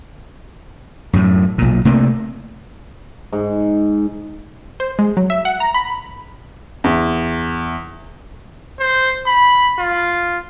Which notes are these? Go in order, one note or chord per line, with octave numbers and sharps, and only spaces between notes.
F#2 A2
B1 A#2
C3 A3 A#3
G#2
C5
G#3
F#3
E5
F#5
A#5
B5
E2
C5
B5
F4